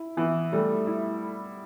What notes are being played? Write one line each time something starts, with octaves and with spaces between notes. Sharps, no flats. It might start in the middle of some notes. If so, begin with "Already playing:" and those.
Already playing: E4
E3 B3
G3 A3
E4